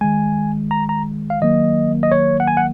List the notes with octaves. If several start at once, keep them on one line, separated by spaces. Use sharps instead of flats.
D#3 G#3 G#5
A#5
A#5
F5
D#3 F#3 A#3 D#5
D#5
C#5
F#5
G#5
F#5